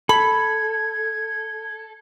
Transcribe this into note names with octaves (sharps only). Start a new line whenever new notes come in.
A4 B5 G#6